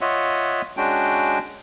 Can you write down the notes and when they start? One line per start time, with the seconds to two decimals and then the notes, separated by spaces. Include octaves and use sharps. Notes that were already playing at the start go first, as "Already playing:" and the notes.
0.01 F4 C#5 D#5 E5 F#5
0.77 G#3 C#4 D4 F#4 G5